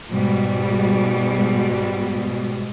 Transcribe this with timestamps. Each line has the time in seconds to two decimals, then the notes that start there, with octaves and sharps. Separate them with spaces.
0.11 G#2 B2 G3